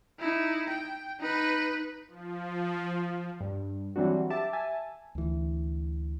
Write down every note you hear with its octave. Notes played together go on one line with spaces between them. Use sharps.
D#4 E4
G5
D#4 B4
F3
G2
E3 F#3 G3 C4 D4 F#4
G4 E5 A5 D6
E5 G#5 A5
D2 E3